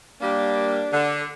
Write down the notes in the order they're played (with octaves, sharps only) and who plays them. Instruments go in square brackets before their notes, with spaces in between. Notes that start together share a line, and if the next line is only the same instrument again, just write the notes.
[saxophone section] G3 A#3 [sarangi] D4
[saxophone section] D3